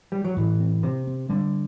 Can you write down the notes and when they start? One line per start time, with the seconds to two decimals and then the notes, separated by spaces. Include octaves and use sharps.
0.12 G3
0.24 F#3
0.37 A2 E3
0.60 C4
0.83 C3 C4
1.07 C4
1.29 D3 G3